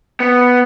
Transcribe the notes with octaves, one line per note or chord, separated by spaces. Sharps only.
B3